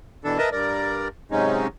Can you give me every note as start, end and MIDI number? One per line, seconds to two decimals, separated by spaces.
0.24 0.38 47
0.24 0.38 52
0.24 0.38 62
0.24 0.38 69
0.38 0.49 70
0.38 0.49 71
0.38 0.49 75
0.38 0.49 76
0.38 0.49 81
0.52 1.08 43
0.52 1.08 70
0.52 1.08 74
1.31 1.67 44
1.31 1.67 48
1.31 1.67 54
1.31 1.67 56
1.31 1.67 61
1.31 1.67 63